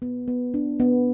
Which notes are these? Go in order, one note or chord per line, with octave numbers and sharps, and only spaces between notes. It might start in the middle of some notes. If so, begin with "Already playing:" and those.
B3
B3
D4
B3